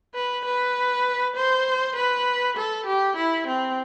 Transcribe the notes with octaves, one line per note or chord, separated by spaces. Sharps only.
B4
B4
C5
B4
A4
G4
E4
C4